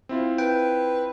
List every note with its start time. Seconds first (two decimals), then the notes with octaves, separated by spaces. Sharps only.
0.09 C4 E4 F4
0.38 B4 G5